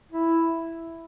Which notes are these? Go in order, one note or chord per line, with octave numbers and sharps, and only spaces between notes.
E4